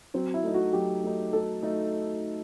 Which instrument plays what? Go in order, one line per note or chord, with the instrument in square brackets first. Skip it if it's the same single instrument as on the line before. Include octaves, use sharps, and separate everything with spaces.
[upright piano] F#3 [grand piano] C4
[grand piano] E4
[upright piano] A3 D#4
[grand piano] F#4
[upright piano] F#3 [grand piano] G4
[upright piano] A3 D#4
[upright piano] F#3 [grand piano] A4
[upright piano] A3 D#4